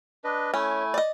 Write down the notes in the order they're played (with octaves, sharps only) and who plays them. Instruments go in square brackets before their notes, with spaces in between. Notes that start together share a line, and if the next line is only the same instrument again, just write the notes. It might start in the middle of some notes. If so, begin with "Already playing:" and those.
[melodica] D4 B4 D#5
[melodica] A3 E4 G#5 [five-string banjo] C#4
[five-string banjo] D5 D#5